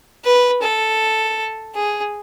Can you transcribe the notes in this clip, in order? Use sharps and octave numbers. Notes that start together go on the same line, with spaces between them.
B4
A4
G#4